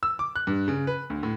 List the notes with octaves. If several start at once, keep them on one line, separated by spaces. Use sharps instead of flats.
E6
D6
F#6
G2
C#3
B4
D2
A2